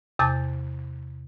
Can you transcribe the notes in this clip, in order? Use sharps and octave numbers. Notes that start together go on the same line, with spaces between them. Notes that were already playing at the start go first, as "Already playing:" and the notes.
E2 C3 A5 D6 G6 A6